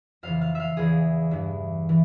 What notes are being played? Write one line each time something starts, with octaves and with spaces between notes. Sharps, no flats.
F2 C#3 E3 F5
F5
E5 F5
E2 E3 G#4
G2 E3
E3